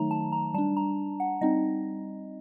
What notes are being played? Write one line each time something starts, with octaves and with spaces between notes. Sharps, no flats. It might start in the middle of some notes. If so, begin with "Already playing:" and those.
Already playing: D#3 F#3 A3 D#4 A#5
A5
A#5
G3 D4 A5
A#5
F#5
G3 C4 D#4 D#5